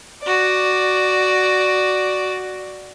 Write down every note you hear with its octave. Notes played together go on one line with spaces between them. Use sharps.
F#4 D5